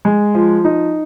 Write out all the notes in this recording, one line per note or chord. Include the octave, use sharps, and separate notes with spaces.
G#3
F3
D#4